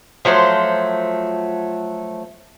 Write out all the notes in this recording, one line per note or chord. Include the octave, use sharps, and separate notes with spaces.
F3 F#3 A3 C5